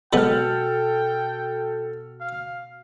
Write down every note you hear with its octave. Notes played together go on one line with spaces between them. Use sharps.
B2 F#3 G#3 B3 F#4 A4 G5 F6
F5